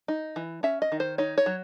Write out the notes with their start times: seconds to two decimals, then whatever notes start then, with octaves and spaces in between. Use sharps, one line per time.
0.08 D#4
0.36 E3
0.63 C#4 E5
0.82 D#5
0.92 D#3
1.00 C5
1.18 D#4 C#5
1.38 C#5
1.46 F#3